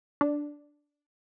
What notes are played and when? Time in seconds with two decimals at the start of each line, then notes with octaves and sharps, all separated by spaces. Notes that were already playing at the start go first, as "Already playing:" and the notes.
0.21 D4